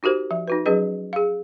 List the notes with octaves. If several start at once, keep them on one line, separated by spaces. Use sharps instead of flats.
D#4 F#4 G4 A#4 C5
F3 E5
D#4 F#4 B4
F#3 C#4 G#4 B4 D#5
G#4 F5